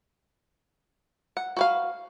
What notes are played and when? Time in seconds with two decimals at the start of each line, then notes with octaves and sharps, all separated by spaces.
1.37 F#5
1.57 F#4 B4 F5